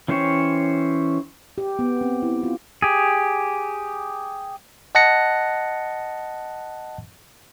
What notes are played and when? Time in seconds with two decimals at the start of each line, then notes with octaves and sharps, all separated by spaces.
0.08 E3 C#4 G4 C5 C#5
1.58 G4
1.79 B3
2.01 C4
2.23 E4
2.43 F4
2.82 G4 G#4
4.95 D#5 F#5 A5 F#6 A#6 C#7